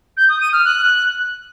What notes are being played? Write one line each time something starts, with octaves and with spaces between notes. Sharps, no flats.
G6
D#6
D#7
F6
F#6